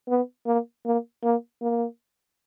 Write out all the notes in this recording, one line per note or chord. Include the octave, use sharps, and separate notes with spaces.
B3
A#3
A#3
A#3
A#3